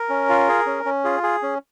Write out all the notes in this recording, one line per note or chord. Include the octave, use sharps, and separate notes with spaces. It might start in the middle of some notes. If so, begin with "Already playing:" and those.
Already playing: A#4
C#4
F4
G#4
C#4
C#4
F4 G#4
G#4
C#4